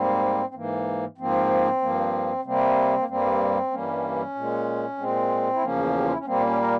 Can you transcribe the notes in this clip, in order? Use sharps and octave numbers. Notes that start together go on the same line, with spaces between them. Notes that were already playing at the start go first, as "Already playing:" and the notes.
Already playing: G#2 G3 A#3 C4
C4
G#2 E3 A#3
G#2 F3 A#3 C4
G2 F3 A#3
C3 G3 A#3 C4
A#3
G2 G3 A#3 C4
G2 E3 G3 A#3 C#4
A#2 G#3
A#2 G#3 C4
E4
E2 C#3 F3 A#3 C#4
G4
F4
E4
C#4
A#2 G3 A#3 C4
C#4
A#4